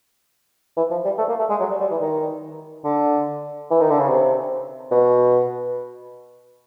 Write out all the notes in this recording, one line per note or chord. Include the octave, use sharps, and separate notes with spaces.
E3
F3
G3
A3
A#3
A3
G#3
F#3
G3
G3
E3
D#3
D3
E3
D#3
D3
C#3
C3
B2